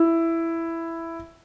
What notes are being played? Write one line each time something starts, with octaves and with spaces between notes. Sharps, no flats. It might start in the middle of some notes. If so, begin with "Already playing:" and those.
Already playing: E4